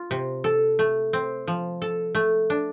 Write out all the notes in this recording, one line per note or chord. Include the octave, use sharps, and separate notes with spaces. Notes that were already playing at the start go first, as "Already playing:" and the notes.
Already playing: F4
C3
A4
A3
C4
F3
A4
A3
D4